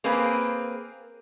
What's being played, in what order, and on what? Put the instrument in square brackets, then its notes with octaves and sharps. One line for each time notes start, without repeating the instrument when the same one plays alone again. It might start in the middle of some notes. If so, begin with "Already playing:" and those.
[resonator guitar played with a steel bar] A#3 C4 G#4 B4